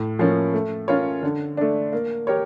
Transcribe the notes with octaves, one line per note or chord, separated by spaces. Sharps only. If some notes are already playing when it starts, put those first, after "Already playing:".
Already playing: A2
F3 A#3 C#4
A3
C#4 F4 A#4 C#5
D3
A3 D4
A#3
G4 A#4 C#5